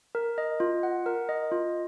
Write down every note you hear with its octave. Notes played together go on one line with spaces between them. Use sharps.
A#4
D#5
F4
F#5
A#4
D#5
F4